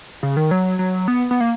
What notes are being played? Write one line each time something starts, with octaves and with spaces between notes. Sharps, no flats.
C#3
D#3
F#3
F#3
B3
B3
A#3